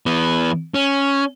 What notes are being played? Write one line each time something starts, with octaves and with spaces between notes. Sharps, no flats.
E3 B3
C#4